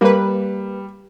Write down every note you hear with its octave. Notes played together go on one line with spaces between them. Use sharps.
G3 A#3 B4